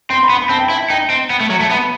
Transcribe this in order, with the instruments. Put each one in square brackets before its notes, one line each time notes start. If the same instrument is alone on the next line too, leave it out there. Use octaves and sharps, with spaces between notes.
[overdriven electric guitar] C4 [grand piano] C6
[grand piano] B5
[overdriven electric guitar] B3
[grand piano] B5
[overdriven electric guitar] C4 [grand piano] A5
[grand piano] G5
[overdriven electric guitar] E4 [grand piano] A5
[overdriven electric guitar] D#4 [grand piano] G5
[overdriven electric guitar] C4
B3
A3
F#3
[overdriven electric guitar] A3 [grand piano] A5
[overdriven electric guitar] B3 [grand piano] B5